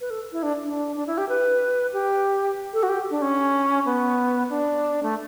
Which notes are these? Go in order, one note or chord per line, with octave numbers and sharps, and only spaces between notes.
B4
A4
E4
D4
D4
D4
E4
G4
B4
G4
A4
F#4
G4
D4
C#4
B3
D4
A3